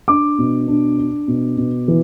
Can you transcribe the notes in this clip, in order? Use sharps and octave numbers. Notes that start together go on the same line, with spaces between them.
D4 D6
B2
D4
D4
B2
B2
E3